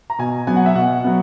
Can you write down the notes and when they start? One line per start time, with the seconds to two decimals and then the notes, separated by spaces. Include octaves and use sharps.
0.10 A#5
0.19 B2 G#5
0.47 F#3 B3 G#5
0.56 F#5
0.66 E5
0.75 B2 F#5
1.04 F#3 B3